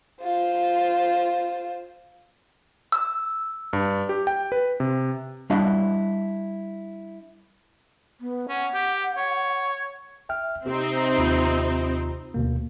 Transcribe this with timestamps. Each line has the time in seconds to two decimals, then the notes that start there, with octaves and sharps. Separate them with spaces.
0.23 F4 C5
2.92 E6
3.73 G2
4.09 G4
4.27 G5
4.52 B4
4.80 C3
5.50 G3 D4 E4 F#4 D#5 F5
8.21 B3
8.49 C#4 F#5
8.74 G4
9.17 C#5
10.29 E5 G5 F6
10.66 C3 C4 D#4 G4
11.18 D#2 F4 B5
12.34 D2 B2 A#3